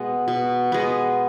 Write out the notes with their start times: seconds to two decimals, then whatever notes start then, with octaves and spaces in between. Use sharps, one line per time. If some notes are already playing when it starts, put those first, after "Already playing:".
Already playing: B2 G#3 B3
0.28 B2
0.72 G#3 B3